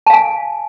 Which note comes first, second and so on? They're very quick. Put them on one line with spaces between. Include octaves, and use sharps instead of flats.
A5 F5 G#5